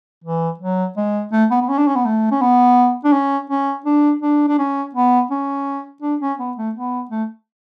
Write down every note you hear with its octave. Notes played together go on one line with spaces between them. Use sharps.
E3
F#3
G#3
A3
B3
B3
C#4
D4
C#4
B3
A3
C#4
B3
D4
C#4
C#4
D4
D4
D4
C#4
B3
C#4
D4
C#4
B3
A3
B3
A3